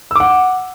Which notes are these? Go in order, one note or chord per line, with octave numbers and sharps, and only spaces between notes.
F#5 D6 E6